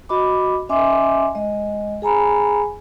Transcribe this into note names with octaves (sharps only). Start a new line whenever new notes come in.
F#4 D#5 B5 D6
C#4 D#5 E5 G#5 C6 D6
G#3 D#5
G#4 G#5 A#5 B5